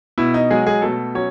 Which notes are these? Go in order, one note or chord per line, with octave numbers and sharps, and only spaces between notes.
B2 E4
D#4
F#3 G#3 G#4
G#3 G#4
B2 A3 A4
F#3 C#4 C#5